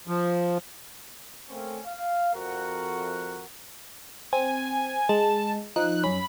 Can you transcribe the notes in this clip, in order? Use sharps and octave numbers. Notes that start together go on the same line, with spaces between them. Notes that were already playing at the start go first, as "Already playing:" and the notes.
F3
A3 A#3 C4 C#4
F5
F2 F#4 A#4 F#5
C4 G#5
G#3 A5
F3 D#4 F#6
F#2 C#4 B5